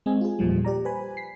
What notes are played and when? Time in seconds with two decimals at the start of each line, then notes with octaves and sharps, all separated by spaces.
0.06 G#3 C4 D#5 G#5
0.21 F4 G#4
0.39 E2 A#2 F3 G3
0.65 G4 D5 A#5
0.85 B4 C5 G#5 B5
1.17 B6 C7